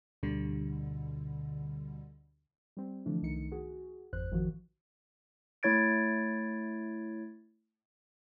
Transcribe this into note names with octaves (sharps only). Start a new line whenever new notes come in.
D2 B2 D3 G3
G3 C4
D3 E3 F3 A3 D4
C2 D#3 A3 D#4 C#7
F#4 G#4
G#1 F2 C5 F#6
A1 D#3 F3 F#4
A3 E4 C#5 G#6 A6 D7